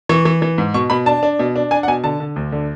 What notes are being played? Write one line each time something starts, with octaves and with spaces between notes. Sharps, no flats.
E3 C#6
E3
E3
G#2
B2 C#6
B2 B5
D4 A5
D4
B2
D4
D4 G#5
F#5
B2 G#5
D3 A5
D3
D2
D3